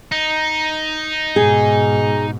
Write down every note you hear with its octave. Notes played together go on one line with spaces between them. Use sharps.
D#4
G#2 B2 G#4